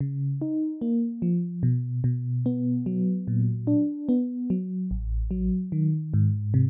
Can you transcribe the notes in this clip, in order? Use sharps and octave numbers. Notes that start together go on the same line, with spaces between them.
C#3
D#4
A#3
F3
B2
B2
B3
F#3
A#2
D4
B3
F#3
A1
F#3
D#3
G#2
C3